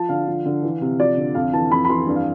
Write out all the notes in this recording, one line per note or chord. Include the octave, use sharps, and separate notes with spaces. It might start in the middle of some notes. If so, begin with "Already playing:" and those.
Already playing: F3 A5
D3 F5
F3
D3
E3
C3
F3 D5
D3
F2 F5
E3 A5
F2 B5
B5
E3 C6
G2
F5